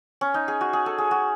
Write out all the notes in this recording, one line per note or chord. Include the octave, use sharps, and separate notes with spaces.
C#4
D#4
G#4
F#4
G#4
A4
G#4
F#4